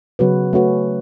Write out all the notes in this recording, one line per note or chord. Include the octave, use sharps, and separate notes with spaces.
C#3 F#3 B3 F#4 B4
A3 C#4 F#4 B4